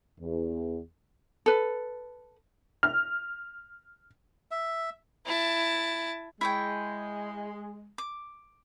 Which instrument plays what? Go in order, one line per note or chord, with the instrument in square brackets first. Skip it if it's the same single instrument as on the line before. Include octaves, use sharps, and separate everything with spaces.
[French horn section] E2
[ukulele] A4 B4
[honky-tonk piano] F6
[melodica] E5
[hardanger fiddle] E4 A5
[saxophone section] G#3 [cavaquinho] E4 C#5 G5
[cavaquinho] D6